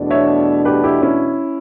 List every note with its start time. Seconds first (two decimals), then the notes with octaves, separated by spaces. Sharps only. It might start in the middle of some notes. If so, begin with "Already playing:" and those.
Already playing: E2 B2 A3 D4
0.11 C#5 E5
0.65 G4 B4
0.84 E4 G4
1.02 C#4 E4